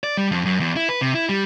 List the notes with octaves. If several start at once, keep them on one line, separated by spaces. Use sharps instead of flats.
D5
G3
F2
F#2
E2
E4
B4
C3
E4
G3